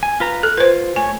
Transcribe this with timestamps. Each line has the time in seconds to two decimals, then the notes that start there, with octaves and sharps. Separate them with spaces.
0.03 G#5
0.20 F4 B4 A#5
0.43 A4 F#6
0.57 F4 B4 C5
0.96 A3 C#5 G#5